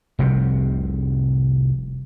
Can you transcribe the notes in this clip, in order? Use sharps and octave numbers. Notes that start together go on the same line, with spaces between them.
F1 C2 C3